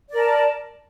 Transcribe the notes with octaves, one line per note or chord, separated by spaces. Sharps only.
A#4 D5 A5